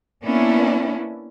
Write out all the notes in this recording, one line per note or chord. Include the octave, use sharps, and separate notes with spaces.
A#3 B3 C#4 D4 E4